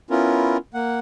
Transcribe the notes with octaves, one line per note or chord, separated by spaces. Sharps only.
B3 C#4 E4 F4 A#4
A#3 F#5